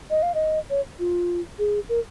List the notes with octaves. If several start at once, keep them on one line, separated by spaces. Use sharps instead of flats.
D#5
F5
D#5
C#5
F4
G#4
A#4